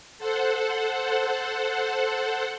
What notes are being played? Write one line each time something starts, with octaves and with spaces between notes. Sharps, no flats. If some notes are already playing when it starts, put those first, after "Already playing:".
A4 C5 F#5